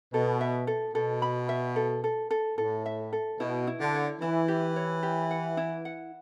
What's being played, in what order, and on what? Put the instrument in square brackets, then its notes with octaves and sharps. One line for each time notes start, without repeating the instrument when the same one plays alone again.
[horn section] B2 [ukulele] A4
[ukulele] E5
A4
[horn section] B2 [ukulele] A4
[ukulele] B5
E5
A4
A4
A4
[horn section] A2 [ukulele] A4
[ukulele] E5
A4
[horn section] B2 [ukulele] E4
[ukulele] E4
[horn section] D3
[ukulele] C#5
[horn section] E3 [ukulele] E4
[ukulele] G4
C#5
G4
F#5
E4
F#5